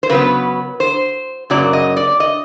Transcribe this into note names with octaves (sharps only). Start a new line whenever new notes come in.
C5
C#3 F#3 B3 B4
C5
F#2 C#3 F#3 A#3 D5
D#5
D5
D#5